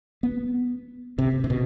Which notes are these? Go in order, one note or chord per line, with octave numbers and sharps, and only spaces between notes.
B3
C3
C3
B2